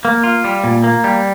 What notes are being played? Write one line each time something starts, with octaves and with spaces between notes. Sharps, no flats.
A#3
F4
G3
A#2
A#3
G3